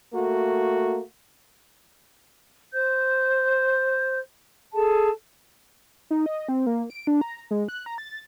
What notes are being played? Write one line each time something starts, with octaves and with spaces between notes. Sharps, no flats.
A3 A#3 F#4
C5 G6
G#4 A4 A5
D#4
D#5
C4
A#3
D7
D4
A#5
G#3
F#6
A#5
A6